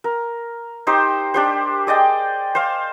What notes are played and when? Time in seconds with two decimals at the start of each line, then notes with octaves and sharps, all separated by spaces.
0.04 A#4
0.87 D#4 G4 C5
1.34 D4 G4 C5
1.87 G#4 D5 D#5 G5
2.55 C5 F5